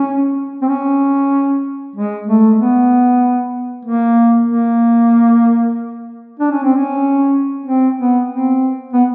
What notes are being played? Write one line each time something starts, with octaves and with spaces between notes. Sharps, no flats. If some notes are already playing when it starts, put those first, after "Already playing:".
Already playing: C#4
C4
C#4
G#3
A3
B3
A#3
A#3
D4
C#4
C4
C#4
C4
B3
C4
B3